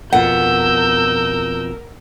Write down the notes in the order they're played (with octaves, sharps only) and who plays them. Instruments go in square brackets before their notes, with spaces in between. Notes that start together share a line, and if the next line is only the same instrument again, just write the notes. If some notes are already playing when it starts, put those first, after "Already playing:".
[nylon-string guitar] F2 B2 F4 [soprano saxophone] A#4 [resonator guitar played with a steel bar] F#5 [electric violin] E6 G6